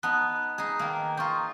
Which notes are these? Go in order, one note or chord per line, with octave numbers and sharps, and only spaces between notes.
B3 D#4 A5 D#6 F#6
D#4 G#4
D#3 A#3
D#4 F4 C6 C#6 G6